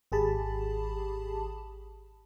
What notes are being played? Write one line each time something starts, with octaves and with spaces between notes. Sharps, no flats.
G#1 G4 G#4 A5 B5